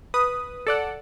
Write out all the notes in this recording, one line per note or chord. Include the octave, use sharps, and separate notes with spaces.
B4 D#6
A4 D5 F#5